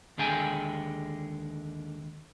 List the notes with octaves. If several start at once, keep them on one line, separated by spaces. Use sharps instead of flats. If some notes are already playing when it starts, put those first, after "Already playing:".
D#2 D3 G#3 G5 G#5